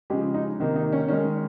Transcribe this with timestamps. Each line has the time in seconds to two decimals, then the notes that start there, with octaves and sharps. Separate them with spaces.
0.10 C#3 F3 G#3 G4
0.34 D#4
0.60 C3 D#3 A#3 D#4
0.76 D#4
0.92 C#4
1.08 D#3 G#3 C#4